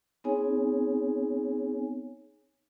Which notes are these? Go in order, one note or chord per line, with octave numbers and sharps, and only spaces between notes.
B3 C4 D#4 G#4 C#5 G#5